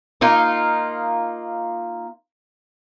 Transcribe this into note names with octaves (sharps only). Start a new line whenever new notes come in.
A#3 D#4 F4